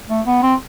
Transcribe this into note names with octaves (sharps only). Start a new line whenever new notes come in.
A3
B3
C4